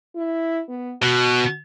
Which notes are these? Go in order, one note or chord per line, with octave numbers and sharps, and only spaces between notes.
E4
B3
B2 F#4